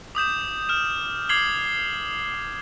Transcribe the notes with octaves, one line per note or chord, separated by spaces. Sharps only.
D6 D#6 G6 E7
F6 E7
D6 F6 G#6 C7 F#7 G7